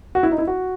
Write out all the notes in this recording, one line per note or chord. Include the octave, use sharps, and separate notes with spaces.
F#4
E4
D#4
E4
F#4